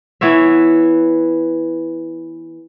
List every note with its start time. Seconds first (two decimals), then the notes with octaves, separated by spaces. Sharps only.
0.21 E3 B3 C#5 E5